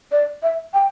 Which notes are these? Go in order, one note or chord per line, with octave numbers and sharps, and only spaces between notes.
D5
E5
G5